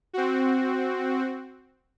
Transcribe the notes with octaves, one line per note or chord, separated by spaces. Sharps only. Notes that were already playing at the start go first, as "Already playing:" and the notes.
C4 F#4